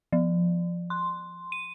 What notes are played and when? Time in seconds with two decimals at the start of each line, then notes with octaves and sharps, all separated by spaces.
0.13 F3
0.90 C6
1.52 D#7